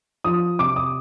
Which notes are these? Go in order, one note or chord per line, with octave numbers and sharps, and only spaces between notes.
F3 D#6
C3 D6
D#6